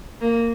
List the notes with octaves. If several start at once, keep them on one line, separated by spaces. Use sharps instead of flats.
A#3